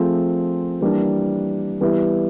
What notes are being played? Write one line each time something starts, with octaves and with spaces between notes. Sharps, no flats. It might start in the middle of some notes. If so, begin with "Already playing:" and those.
Already playing: F3 A3 C4 F4 G#4
E3 G3 A#3 D4
E3 G3 B3 E4 G4